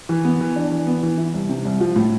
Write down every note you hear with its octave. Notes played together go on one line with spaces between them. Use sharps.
E3
B3
E3
D4
E3
B3
E3
E4
C2
C3
C2
F3
A2